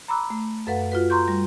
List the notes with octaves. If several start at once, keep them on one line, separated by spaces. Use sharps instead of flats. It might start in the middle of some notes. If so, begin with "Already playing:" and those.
A#5 B5 D6 E6 F#6
A3
F#2 A4 B4 F5 F#5
F4 F#4 B4
A#5 C6 C#6 G6
G3